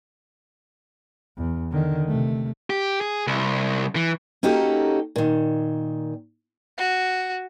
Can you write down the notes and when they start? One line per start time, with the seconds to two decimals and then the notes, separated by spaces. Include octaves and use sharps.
1.38 E2
1.71 D3 D#3
2.08 C3 A3
2.70 G4
3.01 G#4
3.27 C2
3.96 E3
4.43 A#3 C#4 D#4 F#4 G4 A4
5.16 A#2 D#3
6.78 F#4